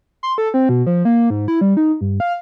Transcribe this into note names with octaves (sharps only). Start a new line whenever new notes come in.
C6
A4
C4
B2
F3
A#3
G#2
E4
G3
D#4
G2
F5